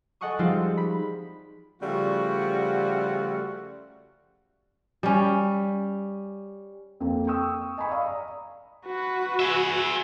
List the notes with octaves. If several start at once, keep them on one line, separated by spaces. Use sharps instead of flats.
A4 D#5 F#5 G#5 C#6 D#6
F3 G3 G#3 C4 D#4 F4
B5
C#3 F3 G3 A3 F4 F#4
G3 C#4
F2 A#3 C4
G5 C#6 D#6 E6
D#5 G#5 A#5 B5 C#6
D5 D#5 F5 D#6
A#5
F#4 B4
G#4 E5